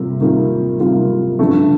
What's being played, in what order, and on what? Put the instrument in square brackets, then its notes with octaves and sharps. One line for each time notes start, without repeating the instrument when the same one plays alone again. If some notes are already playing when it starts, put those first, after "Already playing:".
Already playing: [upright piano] C3 G3 A#3 F4
C3 D#3 G3 A#3 F4
C3 D#3 G3 A#3 F4
A1 G2 D3 F3 A3